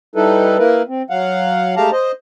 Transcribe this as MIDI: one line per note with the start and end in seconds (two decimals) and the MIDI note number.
0.16 0.57 55
0.16 0.57 63
0.16 0.57 64
0.16 0.57 69
0.16 0.57 71
0.59 0.82 58
0.59 0.82 64
0.59 0.82 70
0.59 0.82 71
0.89 1.02 60
1.10 1.75 54
1.10 1.75 77
1.10 1.75 78
1.76 1.90 56
1.76 1.90 57
1.76 1.90 67
1.76 1.90 77
1.76 1.90 81
1.76 1.90 82
1.92 2.12 72
1.92 2.12 75